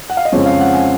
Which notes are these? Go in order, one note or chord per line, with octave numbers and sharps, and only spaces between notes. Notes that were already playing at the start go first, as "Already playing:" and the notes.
F#5
F5
D#5
F2 C#3 G#3 C4 C#5
F5
F#5
G#5